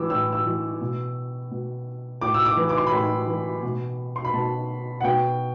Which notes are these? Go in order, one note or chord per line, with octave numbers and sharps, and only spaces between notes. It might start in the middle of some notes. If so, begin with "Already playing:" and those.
Already playing: A2 E3 D6 E6
A2 E6
E6
E3
B2
B2
A2 D6
E6
D6
E3
D6
C6
B5
A2 C6
E3
B2
C6
B5
B2 A5
F#5
B2 G5